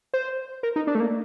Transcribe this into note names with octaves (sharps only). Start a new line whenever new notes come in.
C5
A#4
D#4
D4
A3
A#3